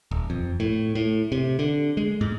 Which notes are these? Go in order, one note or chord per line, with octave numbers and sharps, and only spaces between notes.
D#1
F2
A2
A2
C3
D3
G#3
G#2